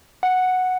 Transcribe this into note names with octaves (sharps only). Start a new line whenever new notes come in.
F#5